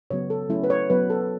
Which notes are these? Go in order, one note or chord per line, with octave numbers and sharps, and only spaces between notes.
C#3 F#3 B3 C#5
A4
F#3 A3 C#4 E4
B4
C#5
F#3 B3 B4
A4